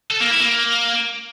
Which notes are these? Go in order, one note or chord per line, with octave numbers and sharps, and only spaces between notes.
A4
A#3
E4
A#3